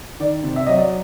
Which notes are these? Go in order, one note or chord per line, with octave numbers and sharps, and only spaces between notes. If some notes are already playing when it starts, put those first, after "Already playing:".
D#3 D5
C3
E5
F#3 D#5
D5